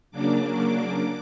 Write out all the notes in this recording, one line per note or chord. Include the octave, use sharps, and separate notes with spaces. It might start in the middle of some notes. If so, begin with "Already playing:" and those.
C#3 F#3 A#3 D4 D6